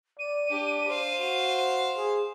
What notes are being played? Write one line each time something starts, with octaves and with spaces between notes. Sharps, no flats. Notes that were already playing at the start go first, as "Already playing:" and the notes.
D5 D#7
D4 G4
C5 F5
F#4
G#4